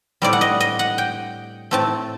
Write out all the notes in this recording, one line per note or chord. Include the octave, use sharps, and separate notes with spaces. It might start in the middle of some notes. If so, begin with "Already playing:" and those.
A2 G3 C4 D5
F#5
D#5
D#5
F#5
G5
A2 A3 C4 A5